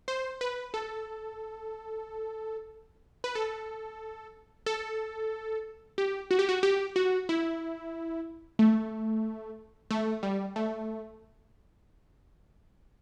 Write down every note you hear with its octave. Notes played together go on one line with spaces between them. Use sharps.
C5
B4
A4
B4
A4
A4
G4
F#4
G4
F#4
G4
F#4
E4
A3
A3
G3
A3